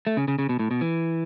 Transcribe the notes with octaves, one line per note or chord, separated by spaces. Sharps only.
A3
C#3
C#3
C#3
B2
A2
B2
E3